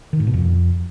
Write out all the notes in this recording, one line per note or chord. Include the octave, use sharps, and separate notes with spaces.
D#3
G#2
B2
F2